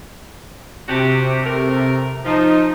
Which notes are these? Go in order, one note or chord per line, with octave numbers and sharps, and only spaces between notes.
C3 D4 F#4 G4
A3 A#4
F3 D#4